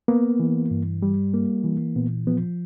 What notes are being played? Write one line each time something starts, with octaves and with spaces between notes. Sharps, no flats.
A#3 B3
E3
G2
G3
A#3
E3
A#2 B3
F3 B3